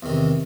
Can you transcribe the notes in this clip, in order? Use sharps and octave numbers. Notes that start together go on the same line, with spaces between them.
E2 C3 D#3